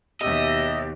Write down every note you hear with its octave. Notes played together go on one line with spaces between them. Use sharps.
D#2 B2 G4 D#5 E5